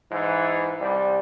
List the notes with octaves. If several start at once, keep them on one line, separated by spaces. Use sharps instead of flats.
G#2 E3
C2 G3